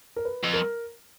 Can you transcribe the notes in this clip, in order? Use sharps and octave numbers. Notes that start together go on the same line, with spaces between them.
A#4
B4
F2
A#4